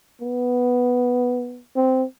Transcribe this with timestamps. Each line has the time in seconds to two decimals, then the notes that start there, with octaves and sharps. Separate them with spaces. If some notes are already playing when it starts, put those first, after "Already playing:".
0.21 B3
1.76 C4